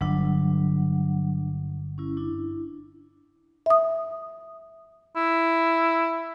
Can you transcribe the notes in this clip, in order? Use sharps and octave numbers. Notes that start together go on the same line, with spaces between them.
G1 F#3 D4 F#5
C#4 E4
D4 E4
E5 D#6
E4